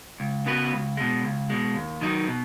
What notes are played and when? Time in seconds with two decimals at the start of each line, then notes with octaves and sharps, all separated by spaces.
0.20 C#2
0.46 C#3 B3 F#4 B4
0.72 C#2
0.97 B2 G#3
1.24 C#2
1.50 B2 G#3
1.75 D#2
2.01 D#3 F#3 D#4
2.28 B2